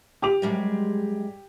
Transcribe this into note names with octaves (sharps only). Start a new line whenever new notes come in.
G4 D6 F7
F#2 G3 G#3